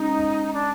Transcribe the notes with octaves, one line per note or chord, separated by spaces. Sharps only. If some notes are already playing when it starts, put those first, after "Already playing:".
Already playing: G#3 C#4 D#4
D4